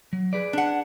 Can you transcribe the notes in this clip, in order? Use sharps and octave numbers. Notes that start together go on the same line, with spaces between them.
F#3
G#4 B4 D5
D4 F#5